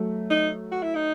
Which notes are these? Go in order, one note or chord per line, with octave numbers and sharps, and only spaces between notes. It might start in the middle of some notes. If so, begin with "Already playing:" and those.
Already playing: F#3 A3
D#4
F#4
E4
D#4